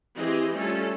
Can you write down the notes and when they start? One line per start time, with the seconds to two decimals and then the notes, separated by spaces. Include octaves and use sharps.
0.16 E3 C4 G4 G#4 D#5
0.55 G3 A3 C#4 F4 A4